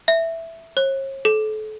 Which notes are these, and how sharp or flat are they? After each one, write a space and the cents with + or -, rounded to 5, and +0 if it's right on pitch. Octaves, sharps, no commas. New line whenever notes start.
E5 +0
C#5 -45
A4 -35